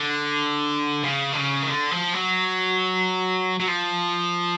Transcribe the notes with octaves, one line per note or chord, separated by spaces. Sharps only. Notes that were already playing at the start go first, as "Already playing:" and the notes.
Already playing: D3
C#3
D3
C#3
D#3
D3
F3
F#3
F#3
F3